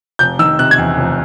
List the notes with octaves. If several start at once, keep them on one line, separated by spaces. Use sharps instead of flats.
F1 G6
D#3 E6
C3 F#6
G#6
E2
F1